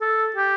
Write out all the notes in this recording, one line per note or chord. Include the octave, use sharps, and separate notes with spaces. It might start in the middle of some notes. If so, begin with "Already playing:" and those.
A4
G4